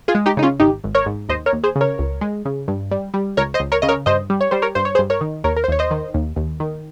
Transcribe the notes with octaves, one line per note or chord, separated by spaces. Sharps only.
F4 G#4
G#3
D#4 G4
C#3 D#4
C#4 F4
G#1 D#4 G4
G#1
A#4 C#5
G#2
D#2 C5 D#5
A#4 C#5
D#2
G#4 C5
C#3
A#4 C#5
C#2
G#3
C#3
G2
G3
G3
C#2 A#4 C#5
C5 D#5
C#2
A#4 C#5
C#3 D#5
A#4 C#5
G2 C5 D#5
G3
C#5
G3 C5
A#4 C#5
G2 C5
C#5
G#4 C5
G2
A#4 C#5
D#3
D#2 A#4 C#5
A#4
C5
D#2 C#5
C5 D#5
D#3
D#2
D#2
D#3